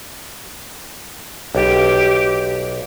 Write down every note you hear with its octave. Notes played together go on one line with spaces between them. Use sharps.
B1 G4